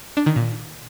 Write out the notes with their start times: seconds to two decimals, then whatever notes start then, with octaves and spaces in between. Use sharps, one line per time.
0.17 D4
0.26 D#3
0.36 A#2